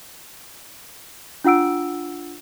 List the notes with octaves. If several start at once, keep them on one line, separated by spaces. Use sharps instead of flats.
D4 F4 F#5 E6 D7